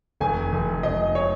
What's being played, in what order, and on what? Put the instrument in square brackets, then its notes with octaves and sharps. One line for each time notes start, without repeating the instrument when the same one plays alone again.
[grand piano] F1 [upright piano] G#5
[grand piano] F1
[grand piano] F1 [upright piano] D#5
[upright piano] C#5